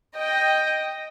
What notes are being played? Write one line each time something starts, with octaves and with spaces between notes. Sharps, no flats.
D#5 G5